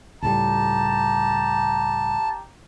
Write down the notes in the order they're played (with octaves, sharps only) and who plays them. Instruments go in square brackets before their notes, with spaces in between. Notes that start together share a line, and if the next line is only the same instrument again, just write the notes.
[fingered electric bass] C#2 A2 G3 [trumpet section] G4 A#5 [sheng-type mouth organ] A5